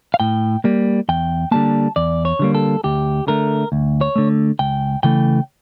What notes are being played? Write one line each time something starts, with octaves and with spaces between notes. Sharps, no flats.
F5
A2 G5
G3 A#3
E2 G5
D3 G3 A#3 A5
E2 D5
C#5
D3 G3 A#3
A4
D2 G4
D3 A3 A#4
D2
C#5
D3 A3
C#2 G5
C#3 E3 A3 G5